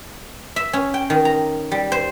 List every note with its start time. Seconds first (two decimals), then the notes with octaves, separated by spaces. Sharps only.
0.56 E5
0.73 C#4
0.94 G5
1.10 D#3
1.25 A#5
1.72 G3
1.92 C5